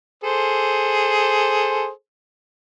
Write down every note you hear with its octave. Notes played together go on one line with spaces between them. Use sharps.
G#4 A4 C5